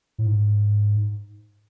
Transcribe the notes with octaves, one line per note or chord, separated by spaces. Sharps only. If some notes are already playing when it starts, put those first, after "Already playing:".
A2
G#2